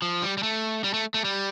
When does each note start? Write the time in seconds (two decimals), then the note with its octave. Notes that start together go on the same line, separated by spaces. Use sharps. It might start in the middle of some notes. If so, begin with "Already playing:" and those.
0.02 F3
0.22 G3
0.37 G3
0.43 A3
0.84 G3
0.94 A3
1.14 A3
1.25 G3